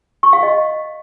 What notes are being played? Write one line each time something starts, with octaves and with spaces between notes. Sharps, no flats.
C#6
F5
D#5